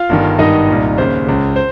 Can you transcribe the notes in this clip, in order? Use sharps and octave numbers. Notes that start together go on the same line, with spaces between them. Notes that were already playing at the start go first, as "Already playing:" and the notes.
Already playing: F4 F5
G1 G2 D#3
G#1 G2 D#3 D#4 D#5
C2 A#2
D#2 C#3 C5
C#2 C#3
C5